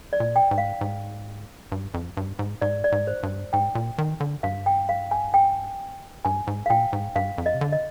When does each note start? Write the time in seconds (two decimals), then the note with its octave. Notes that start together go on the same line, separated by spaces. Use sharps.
0.13 D5
0.20 A#2
0.36 G5
0.51 G#2
0.58 F5
0.81 G#2
1.72 G2
1.94 F2
2.17 G2
2.39 G#2
2.61 G#2 D5
2.84 D5
2.92 G#2
3.07 C5
3.23 G2
3.53 G#2 G5
3.75 A#2
3.98 D#3
4.20 D3
4.43 G2 F5
4.66 G5
4.89 F5
5.11 G#5
5.34 G5
6.25 G2 G#5
6.47 G#2
6.66 F5
6.70 A#2 G5
6.93 G#2
7.16 G2 F5
7.38 F2
7.46 D#5
7.54 C3
7.61 D3
7.72 D#5